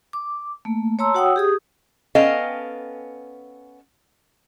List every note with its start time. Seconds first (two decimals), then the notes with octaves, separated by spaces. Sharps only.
0.13 D6
0.65 A3 A#3
0.99 C#5 A5 A#5 C6 E6
1.14 F#4 C#5 F#5 G5 D#6 E6
1.36 G4 G#4 D#6
2.15 B3 C#4 A4 D#5 F5 G5